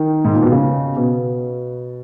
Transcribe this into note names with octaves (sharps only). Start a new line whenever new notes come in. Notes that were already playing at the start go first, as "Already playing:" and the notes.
Already playing: D#3
G#2
A#2
B2
C#3
B2